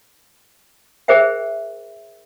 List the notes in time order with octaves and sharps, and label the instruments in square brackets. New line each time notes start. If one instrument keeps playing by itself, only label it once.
[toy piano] G#4 A#4 C5 E5 G5